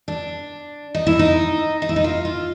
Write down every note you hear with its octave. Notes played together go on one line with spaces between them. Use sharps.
D4
D#4
E4
D#4
D#4
E4
D#4
F4
F4